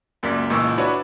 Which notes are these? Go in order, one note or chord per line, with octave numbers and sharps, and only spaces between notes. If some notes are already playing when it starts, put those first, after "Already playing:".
C#2 F#2 A#3 D5 B6
C#2 A#2 E3 D#5 C#6 E6
D4 E4 F#4 B4 C#5 D5